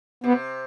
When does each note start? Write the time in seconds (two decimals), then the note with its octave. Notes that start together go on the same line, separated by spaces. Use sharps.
0.24 C3 B3